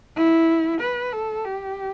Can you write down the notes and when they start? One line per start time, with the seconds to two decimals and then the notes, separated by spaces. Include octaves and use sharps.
0.16 E4
0.81 B4
1.13 A4
1.45 G4